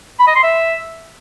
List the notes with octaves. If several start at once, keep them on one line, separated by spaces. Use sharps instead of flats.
B5
D#5
C6
E5